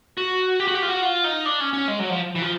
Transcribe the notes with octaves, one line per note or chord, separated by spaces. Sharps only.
F#4
G4
F#4
G4
F4
F#4
F4
D#4
D4
C#4
C#4
G#3
F#3
F3
E3
F3